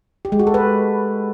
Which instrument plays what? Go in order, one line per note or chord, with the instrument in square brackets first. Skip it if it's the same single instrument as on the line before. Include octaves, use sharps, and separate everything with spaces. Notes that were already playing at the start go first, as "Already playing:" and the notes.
[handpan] G4
G#3
F#4
A4
B4